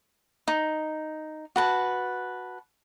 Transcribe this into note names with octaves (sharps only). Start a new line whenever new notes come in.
D#4
F#4 B4 A5